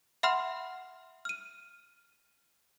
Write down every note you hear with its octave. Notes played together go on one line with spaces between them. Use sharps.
E5 F#5 B5 C6 F6
F6 D#7